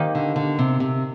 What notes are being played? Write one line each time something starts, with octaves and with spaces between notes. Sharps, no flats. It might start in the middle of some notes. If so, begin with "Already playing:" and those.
Already playing: D#3 A#3 D#4 G4
D3
D3
C3
C3